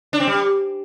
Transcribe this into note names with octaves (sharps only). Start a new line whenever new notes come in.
D4
C4
G3